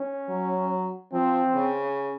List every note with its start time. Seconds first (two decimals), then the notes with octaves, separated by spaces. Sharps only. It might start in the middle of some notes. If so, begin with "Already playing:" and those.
Already playing: C#4
0.29 F#3
1.13 F3 C4
1.55 C#3